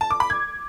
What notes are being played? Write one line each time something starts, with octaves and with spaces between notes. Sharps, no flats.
A5
D6
B5
G#6